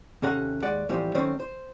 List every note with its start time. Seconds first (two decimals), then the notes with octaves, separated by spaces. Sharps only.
0.22 D#2 C3 C#4 A4 F#5 A#5
0.63 D#2 G#3 D5 F#5
0.89 A2 E3 F3 G3 C4
1.15 D#3 F#3 A3 C4 C#4 C5
1.40 C5